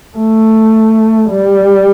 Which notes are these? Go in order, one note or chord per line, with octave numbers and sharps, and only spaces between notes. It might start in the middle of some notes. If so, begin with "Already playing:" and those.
A3
G3